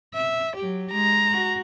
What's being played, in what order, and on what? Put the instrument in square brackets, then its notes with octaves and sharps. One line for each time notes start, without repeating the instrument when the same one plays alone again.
[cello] E5
F#3 G4
[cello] G#3 [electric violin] A#5
[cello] F#4